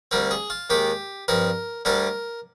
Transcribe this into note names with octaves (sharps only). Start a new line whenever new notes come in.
D2 D3 G3 C4 A#4
G#4
F4
D#2 D#3 G#3 G4
G2 F3 C4 A#4
D2 D3 G3 D4 A#4